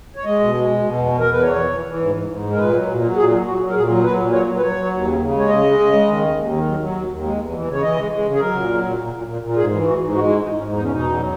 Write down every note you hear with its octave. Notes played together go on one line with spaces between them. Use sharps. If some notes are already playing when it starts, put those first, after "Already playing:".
C#5
G#3 D#5
B2
G#3
B2
B2
E2
E2
A#4
E2 B4
E3 C#5
E3
E3
E3
G#2
G#2
G#2
G#3
A#4
A#2 B4
F#3
A#2
F#3
A#2 G#4
F#3
F#3 F#4
F#3
A#4
A#2 G#4
F#3
F#3 B4
A#2
F#3 C#5
F#3
B4
F#3 C#5
F#3
D#2
C#3
C#3
G#3 C#5
C#3 D#5
G#3
C#3
G#3
D#3
D#2
D#2
D#3
F#3
F#3
D#2
D#2
G#3
E2
E3
C#3 C#5
E3 D#5
G#3
G#3
C#3
G#4
F#3 A#4
A#2
F#3
A#2
A#2
A#2
A#2
A#2
G#2 G#4
E3
G#2 F#4
G#2
G#3 F#4
G#2 E4
G#2 D#4
G#2 C#4
E2 D#4
C#4
B2 D#4
E2
F#3